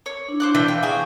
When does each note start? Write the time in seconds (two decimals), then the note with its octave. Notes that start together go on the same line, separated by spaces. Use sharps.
0.06 C#5
0.28 D4 E4
0.40 C5 D6 F#6
0.55 E3 D4 G5
0.68 F5 G5
0.83 F#4 G#4